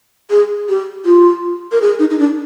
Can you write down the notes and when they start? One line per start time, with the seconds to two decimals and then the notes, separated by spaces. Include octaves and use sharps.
0.30 G#4
0.69 G4
1.05 F4
1.72 A#4
1.82 G#4
1.99 D#4
2.10 D#4
2.19 D4